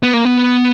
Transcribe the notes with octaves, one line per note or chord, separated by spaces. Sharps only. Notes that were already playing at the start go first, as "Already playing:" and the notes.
B3
A#3
B3